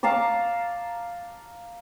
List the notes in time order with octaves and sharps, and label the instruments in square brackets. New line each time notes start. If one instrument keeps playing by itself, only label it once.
[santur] F5 A5 A#5 D6